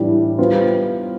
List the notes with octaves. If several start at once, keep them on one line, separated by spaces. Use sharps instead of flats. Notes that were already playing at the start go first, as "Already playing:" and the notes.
Already playing: A2 E3 G3 D4
G3 B3 F4 C5